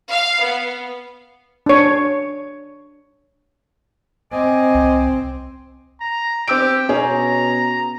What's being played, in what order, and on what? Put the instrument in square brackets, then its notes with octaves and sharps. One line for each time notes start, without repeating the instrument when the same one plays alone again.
[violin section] F5
B3
[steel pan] D4 C#5
[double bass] C4 [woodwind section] D#5 G#5 D6
[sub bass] C2
[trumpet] A#5
[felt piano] C4 E6 D7 [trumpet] G4
[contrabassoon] B2 [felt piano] C#4 G#4 [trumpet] A#5